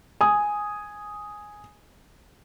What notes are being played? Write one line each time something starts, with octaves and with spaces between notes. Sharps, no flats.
G#5 D#6